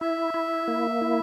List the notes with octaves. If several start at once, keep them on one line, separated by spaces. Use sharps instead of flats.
E4 E5
E4
A#3
E4